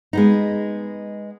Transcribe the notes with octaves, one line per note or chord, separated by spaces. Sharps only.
G#3 B3 D#4